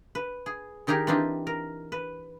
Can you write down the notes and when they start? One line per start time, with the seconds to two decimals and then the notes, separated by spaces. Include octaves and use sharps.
0.15 B4
0.46 G#4
0.87 D#3 D#4 G4 G#4 A#4
1.07 E3 C4 D4 D#4 F4 G4
1.47 A#4
1.92 B4